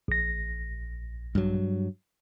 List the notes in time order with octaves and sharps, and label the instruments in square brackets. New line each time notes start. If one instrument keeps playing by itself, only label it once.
[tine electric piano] A#1 A#6
[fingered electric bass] G2 F#3